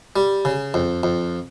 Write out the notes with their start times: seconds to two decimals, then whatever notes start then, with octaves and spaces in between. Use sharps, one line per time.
0.16 G3
0.45 C#3
0.74 F2
1.03 F2